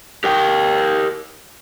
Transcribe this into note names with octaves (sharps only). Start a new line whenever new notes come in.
G4 A#4 G5